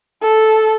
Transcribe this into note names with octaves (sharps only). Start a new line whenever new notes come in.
A4